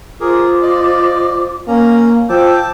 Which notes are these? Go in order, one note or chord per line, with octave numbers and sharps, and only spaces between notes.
F4 G#4 A#4 C5 D6
D5 D#5
A#3 C#4 A#5
F3 G5 A5 D6 E6 G6